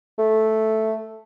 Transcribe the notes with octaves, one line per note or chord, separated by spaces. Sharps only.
A3